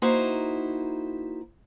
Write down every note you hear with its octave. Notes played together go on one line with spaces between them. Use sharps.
A#3 D#4 E4 F#4 C5